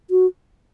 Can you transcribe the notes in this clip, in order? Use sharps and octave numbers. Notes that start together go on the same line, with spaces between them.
F#4